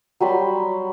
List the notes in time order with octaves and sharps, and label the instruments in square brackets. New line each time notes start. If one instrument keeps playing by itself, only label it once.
[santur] F#3 G3 B5 C6